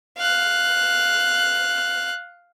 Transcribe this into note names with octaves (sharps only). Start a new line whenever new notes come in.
F5 F#6